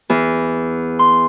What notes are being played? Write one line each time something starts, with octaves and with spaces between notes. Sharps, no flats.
E2
C6